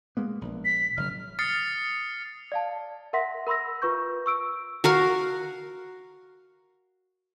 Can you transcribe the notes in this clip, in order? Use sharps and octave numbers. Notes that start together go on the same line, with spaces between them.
G#3 A#3 B3
A#1
B6
F#1 F6
D#6 F6 A6 C7 C#7
D5 F5 A5
A#4 E5 F#5 C6 A#6 B6
A#4 B5 C6 E6 A#6
F4 B4 C#6 G6
C#6 E6 D7
F#4 A#4 F5